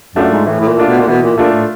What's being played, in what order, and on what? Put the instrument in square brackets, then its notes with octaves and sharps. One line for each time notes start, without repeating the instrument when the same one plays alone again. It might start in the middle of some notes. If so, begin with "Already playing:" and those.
[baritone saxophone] F#2 [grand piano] A3 D4 F4
[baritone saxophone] G#2
[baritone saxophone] A2 [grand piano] E3
[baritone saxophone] A2
A#2
[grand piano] A3 D4 F4
[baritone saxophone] B2
A#2
[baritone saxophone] B2 [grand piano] E3
[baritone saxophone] A#2
[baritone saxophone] A#2 [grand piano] A3 D4 F4
[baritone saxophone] A2